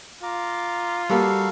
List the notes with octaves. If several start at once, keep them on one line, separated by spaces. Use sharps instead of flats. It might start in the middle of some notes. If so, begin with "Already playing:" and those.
F4 A#5 D6
G3 A#3 F#4 A4 F5